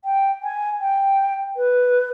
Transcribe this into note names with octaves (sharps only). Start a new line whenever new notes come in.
G5
G#5
G5
B4